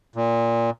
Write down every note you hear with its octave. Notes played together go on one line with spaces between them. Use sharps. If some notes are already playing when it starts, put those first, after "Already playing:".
A#2